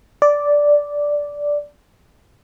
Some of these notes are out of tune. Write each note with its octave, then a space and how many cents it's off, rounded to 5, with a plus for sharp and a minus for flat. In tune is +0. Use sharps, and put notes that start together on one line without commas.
D5 -5